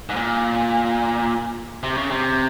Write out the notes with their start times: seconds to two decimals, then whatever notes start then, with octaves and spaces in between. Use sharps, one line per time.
0.09 G#2
0.16 A#2
1.83 C3
1.97 C#3
2.11 C3